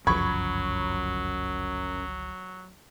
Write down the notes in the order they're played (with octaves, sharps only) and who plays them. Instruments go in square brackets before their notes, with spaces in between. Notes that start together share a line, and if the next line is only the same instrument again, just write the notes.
[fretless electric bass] G1 C#2 F3 [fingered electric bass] F#2 [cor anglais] F#3 [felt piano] B5 C#6 G#6